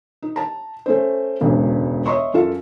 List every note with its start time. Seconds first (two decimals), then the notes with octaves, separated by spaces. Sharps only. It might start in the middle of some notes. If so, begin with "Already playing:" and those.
0.22 D#4
0.36 A5 A#5
0.86 A3 C#4 C5
1.41 E1 D2 G#2 C#3
2.06 C#5 D#5 E5 A#5 C6 C#6
2.34 F#2 F4 A4 F5